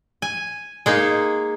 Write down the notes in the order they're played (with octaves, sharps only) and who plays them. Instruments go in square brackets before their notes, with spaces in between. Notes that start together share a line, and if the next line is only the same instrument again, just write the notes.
[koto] G#5
G#3 A#3 D#4